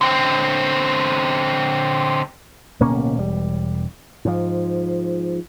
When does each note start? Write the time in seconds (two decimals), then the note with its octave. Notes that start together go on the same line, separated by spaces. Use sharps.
0.01 D3 C4
2.80 D1 B2 A#3 C#4
3.18 E1 G3
4.25 G#2 F3